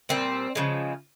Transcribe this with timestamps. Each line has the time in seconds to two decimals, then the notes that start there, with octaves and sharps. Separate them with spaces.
0.09 A#2 G3 C4
0.55 C#3 F3 G#3